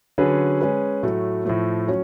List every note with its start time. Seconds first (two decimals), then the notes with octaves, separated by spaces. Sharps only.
0.18 D3 F#3 C#4 G#4 B4
0.60 G#3 C#4 G#4 B4
1.03 A2 F#3 A3
1.45 A2 F3 A3
1.88 F#3 C#4